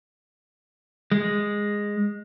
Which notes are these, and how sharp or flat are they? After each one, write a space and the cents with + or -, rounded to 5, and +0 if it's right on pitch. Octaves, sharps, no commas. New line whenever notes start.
G#3 -10